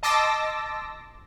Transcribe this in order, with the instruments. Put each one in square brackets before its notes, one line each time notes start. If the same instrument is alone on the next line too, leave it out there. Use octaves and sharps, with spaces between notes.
[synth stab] D#5 A5 C6 D6 E6 A#6